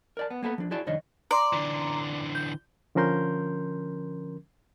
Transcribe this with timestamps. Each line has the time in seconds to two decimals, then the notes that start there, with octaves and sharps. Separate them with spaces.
0.17 A#4 D5 A5
0.31 B3
0.43 A#3 B3 A4 B4
0.58 F3 D4
0.71 E4 F#4 G#4 D5 A5 C6
0.86 C2 F2 D#3 D4 C#5 D#5
1.31 D5 A#5 C6 D6
1.53 D3 E3
2.35 G6
2.95 D3 F3 C#4 A#4 C6 G6